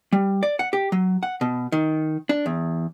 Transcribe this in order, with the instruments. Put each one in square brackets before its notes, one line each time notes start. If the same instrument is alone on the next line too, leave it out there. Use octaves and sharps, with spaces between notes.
[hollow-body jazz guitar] G3
D5
F#5
G4
F#3
F#5
B2
D#3
D4
E2